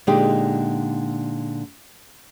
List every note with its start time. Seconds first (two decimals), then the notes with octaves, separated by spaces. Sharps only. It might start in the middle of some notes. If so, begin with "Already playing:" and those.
0.07 A#2 D3 G#3 D#4 G4